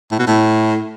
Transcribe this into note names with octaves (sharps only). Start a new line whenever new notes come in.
A2
B2
A2